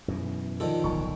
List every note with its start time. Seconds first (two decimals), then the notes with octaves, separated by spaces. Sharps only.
0.08 F#2 B2 E3
0.60 D3 D#3 F3 F4 A4
0.84 D1 B1 C#6